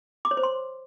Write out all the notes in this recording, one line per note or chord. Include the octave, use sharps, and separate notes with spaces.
D6
C#5
C5
C6